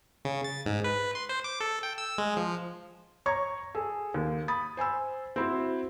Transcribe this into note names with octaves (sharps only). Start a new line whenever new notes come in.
C#3
A6
G#2
B4
C6
C5
D6
A4
G5
E6
G#3
F3
C#5 A#5 C#6 G#6
G#4 A4
D#2
B5 D#6 A6
C5 G#5 B5 E6
C4 E4 F#4